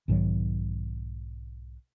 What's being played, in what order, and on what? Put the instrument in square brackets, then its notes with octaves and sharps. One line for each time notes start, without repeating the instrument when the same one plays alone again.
[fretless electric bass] B1 G#2 D#3 F#3